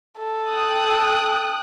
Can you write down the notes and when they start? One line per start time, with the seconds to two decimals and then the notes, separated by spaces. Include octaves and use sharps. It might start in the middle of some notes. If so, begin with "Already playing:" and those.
0.18 A4
0.51 G5 D#6 F#6